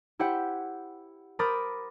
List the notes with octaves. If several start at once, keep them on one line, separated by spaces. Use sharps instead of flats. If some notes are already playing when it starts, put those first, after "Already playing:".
E4 G4 C5 F#5 G5
A#4 C5 B5 D6 D#6 A6